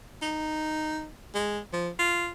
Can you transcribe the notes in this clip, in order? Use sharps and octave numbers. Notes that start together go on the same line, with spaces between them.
D#4
G#3
F3
F4